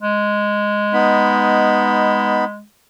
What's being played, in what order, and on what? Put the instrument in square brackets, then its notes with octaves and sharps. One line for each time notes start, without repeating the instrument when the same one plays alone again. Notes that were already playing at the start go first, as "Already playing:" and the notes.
[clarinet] G#3
[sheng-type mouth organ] B3 D#4 B5